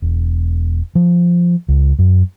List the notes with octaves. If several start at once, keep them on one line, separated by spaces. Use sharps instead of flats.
E1
F3
C#2
F#2